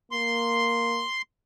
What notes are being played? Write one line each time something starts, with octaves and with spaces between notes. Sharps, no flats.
A#3 C6